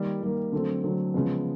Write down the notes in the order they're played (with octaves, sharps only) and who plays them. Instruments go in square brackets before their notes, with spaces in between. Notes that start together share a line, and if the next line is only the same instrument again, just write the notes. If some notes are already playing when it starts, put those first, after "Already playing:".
Already playing: [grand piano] D#3 G3 A#3
D#3 G3 A#3
D3 F#3 A3 C4
D3 F#3 A3 C4
C#3 F3 G#3 B3